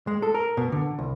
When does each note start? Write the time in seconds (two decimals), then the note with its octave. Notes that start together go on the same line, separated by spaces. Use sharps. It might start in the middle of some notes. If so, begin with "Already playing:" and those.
0.07 G#3
0.22 A4
0.34 A#4
0.57 B2
0.72 D3
0.99 C2